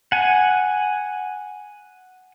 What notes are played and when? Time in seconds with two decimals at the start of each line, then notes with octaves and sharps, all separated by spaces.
0.12 F#5 G#5